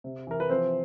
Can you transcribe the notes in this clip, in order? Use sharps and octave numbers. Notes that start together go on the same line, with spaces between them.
C3
E3 A#4
B4
F3 C4 C5